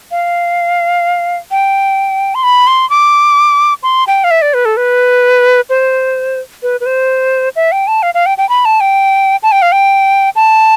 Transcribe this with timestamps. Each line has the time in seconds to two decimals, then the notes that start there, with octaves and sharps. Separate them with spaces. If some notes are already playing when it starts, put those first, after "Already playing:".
0.11 F5
1.51 G5
2.35 C6
2.43 B5
2.67 C6
2.90 D6
3.83 C6
4.07 G5
4.24 F5
4.31 E5
4.42 D5
4.54 B4
4.65 A4
4.77 B4
5.70 C5
6.63 B4
6.81 B4
6.86 C5
7.56 E5
7.72 G5
7.87 A5
8.03 F5
8.14 F5
8.26 G5
8.38 G5
8.49 B5
8.65 A5
8.80 G5
9.43 A5
9.52 G5
9.62 F5
9.72 G5
10.36 A5